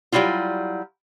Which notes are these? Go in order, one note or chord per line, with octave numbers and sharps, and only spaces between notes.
F#3 G3 C4 E4 F4